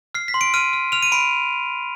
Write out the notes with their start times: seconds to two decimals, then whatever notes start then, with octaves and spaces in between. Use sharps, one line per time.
0.15 F6 C7
0.28 B6
0.34 C6
0.41 D7
0.54 F6 D#7
0.73 F6
0.92 F6 F7
1.03 D#7
1.12 B5 D7